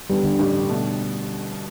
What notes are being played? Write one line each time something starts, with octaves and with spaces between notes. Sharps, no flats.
E2 D3 G3 B3
D3
A1 G2 G3
B2 A3 D4